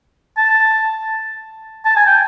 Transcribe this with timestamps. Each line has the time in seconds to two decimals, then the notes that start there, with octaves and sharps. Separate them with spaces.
0.37 A5
1.85 A5
1.96 G#5
2.06 G5